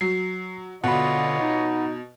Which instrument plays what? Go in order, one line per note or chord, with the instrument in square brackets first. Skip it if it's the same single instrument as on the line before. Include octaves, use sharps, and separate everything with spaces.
[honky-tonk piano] F#3 [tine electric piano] C7
[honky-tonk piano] B2 [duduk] D3 [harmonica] F4 C#5 D#5 [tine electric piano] F#5 B5
[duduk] D#4